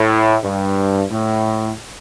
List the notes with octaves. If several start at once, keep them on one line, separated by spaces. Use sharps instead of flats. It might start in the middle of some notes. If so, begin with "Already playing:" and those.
Already playing: A2
G2
A2